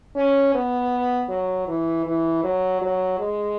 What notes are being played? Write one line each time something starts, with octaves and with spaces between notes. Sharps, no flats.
C#4
B3
F#3
E3
E3
F#3
F#3
G#3